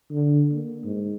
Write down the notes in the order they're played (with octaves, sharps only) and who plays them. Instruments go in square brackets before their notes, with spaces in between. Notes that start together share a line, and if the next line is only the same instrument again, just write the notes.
[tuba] D3
A#3
G#2